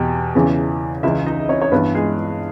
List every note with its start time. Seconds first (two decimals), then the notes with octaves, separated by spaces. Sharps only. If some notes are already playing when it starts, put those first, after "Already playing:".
Already playing: E2 B2 G4
0.35 E2 C#3 E3
1.03 C#2 C#3 E3 E4 E5
1.26 D#4 D#5
1.49 C#4 C#5
1.62 C#5
1.72 G2 E3 B3 B4
1.94 G#3 G#4